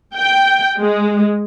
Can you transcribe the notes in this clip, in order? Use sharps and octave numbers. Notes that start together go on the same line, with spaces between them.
G5
G#3